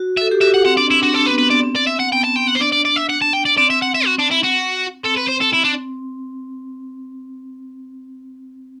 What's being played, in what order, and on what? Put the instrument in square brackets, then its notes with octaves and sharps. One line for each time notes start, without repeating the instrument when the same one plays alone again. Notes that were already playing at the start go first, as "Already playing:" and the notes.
Already playing: [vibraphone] F#4
[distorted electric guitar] E5
[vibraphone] A4
G4
[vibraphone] F#4 [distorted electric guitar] E5
[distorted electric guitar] F#5
[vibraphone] C4 [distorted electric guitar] F#5
[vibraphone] D4 [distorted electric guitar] D5
[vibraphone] C4 [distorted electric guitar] E4
[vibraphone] D4 [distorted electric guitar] F#4
[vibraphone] C4 [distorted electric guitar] A4
[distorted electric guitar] B4
[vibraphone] B3
[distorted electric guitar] B4
[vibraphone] C4
[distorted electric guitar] D5
[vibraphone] C4
[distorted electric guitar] D5
E5
F#5
[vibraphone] B3 [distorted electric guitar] G5
[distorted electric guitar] A5
[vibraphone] C4 [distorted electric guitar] G5
[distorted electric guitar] F#5
C5
[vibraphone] D4 [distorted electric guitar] D5
[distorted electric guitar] D5
D5
E5
F#5
A5
G5
D5
[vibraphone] C4 [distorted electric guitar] D5
[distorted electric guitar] E5
F#5
E5
F#4
D4
E4
F#4
[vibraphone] C4 [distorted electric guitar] A4
[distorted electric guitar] B4
[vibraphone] C4 [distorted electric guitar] C5
[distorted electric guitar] A4
E4
D4